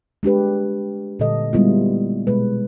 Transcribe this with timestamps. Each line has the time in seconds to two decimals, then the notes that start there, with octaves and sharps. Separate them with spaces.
0.23 G#3 D4 G4 B4
1.19 A#2 D3 G3 A4 D#5
1.53 G3 G#3 A#3 B3 E4 F4
2.27 B2 G#3 B4